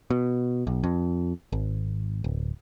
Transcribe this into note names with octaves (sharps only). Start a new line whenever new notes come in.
B2
B1
F2
G#1
D1